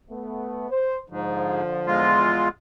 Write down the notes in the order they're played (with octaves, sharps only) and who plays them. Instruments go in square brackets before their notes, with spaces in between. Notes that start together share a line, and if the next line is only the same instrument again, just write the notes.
[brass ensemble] A3 B3
C5
[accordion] G#2 [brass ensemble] D3 F3
[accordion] E2 G#3 F4